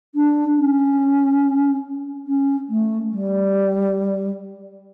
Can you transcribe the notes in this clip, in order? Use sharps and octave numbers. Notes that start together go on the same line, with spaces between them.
D4
C#4
C#4
A3
G3